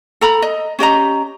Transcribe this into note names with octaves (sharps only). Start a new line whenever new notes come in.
A4 A#5 B5
D#5
C#4 G4 D#5 A#5